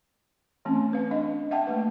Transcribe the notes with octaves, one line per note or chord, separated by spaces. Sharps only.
E3 A3 C4 C#4
B4 F5
D4 D#5 F5
E5 F#5 G5 A5
A3 A#3 B4